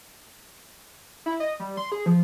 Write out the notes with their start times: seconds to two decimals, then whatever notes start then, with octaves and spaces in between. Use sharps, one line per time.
1.26 E4
1.40 D#5
1.60 G3
1.77 C6
1.92 G#4
2.06 F3